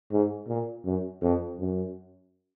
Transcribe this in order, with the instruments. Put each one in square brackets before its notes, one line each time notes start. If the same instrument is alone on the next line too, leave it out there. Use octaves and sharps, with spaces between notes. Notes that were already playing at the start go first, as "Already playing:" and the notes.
[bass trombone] G#2
A#2
F#2
F2
F#2